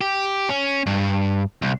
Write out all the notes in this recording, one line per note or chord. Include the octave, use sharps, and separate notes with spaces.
G4
C#4
G2
C2